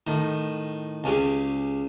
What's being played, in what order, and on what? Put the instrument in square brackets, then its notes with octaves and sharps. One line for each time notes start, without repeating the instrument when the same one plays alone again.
[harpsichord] A2 D#3
C#2 C#4 G4 G#4